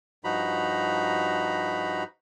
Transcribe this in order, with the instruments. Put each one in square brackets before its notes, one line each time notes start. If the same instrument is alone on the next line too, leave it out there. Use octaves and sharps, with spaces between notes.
[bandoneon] G2 F3 D#4 F#4 A#5 B5